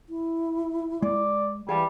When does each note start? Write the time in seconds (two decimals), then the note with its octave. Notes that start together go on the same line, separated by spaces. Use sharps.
0.09 E4
1.02 G#3 D5
1.69 E3 G3 G#4 F5 A5